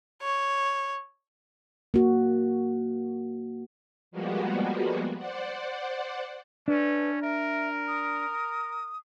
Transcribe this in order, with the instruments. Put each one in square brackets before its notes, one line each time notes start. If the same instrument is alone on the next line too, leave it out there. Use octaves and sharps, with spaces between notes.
[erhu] C#5
[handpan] A#3 F#4
[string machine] F3 G3 G#3 A#3 B3 F#4
C5 D5 F#5
[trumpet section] A3 C#4 [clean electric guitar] D4 [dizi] B4
[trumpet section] A#4 [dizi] E5
[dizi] D#6